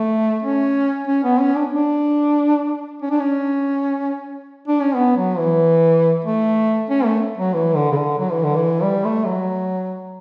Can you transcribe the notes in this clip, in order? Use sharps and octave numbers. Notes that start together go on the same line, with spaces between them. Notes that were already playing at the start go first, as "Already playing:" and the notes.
Already playing: A3
C#4
C#4
B3
C#4
D4
D4
C#4
D4
C#4
D4
C#4
B3
F#3
E3
A3
C#4
A3
F#3
E3
D3
C#3
D3
F#3
E3
D3
E3
G3
A3
F#3